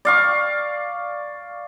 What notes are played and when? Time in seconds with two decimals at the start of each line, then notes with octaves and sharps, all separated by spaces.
0.05 D5 F5 C#6